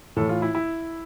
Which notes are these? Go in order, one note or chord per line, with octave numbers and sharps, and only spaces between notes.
A2 E3 A4
F4
E4
E4